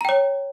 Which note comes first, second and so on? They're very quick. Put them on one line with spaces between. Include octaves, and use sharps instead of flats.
A#5 G5 C#5